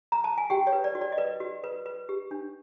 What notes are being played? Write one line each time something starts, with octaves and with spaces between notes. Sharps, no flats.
A#5
A5
G#5
F#4 G4 G5
C#5
B4
D5
F#4
D5
D#5
B4 D5
F#4
B4
B4
G4
D4